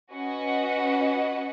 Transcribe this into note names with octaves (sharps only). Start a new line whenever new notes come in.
C#4 F#4 B4 D#5 F#5